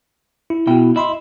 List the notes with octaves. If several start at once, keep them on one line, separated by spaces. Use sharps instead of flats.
E4
B2 E4 F#4 G5
E4 D#5 B5 C6